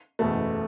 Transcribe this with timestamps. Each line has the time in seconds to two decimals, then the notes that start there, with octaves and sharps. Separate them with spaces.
0.19 F#1 E2 B2 A3 B3 A4